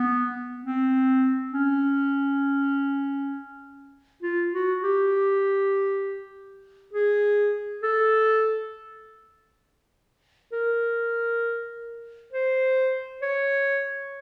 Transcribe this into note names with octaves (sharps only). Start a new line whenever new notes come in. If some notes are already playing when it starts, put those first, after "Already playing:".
Already playing: B3
C4
C#4
F4
F#4
G4
G#4
A4
A#4
C5
C#5